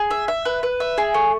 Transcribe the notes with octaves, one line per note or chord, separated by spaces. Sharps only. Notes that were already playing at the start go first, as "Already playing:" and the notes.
Already playing: G#4
E5
E5
B4
B4
E5
G#4
A3